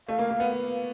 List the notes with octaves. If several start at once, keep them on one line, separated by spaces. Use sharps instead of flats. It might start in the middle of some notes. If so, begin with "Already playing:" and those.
A3 F5
A#3
A#3
B3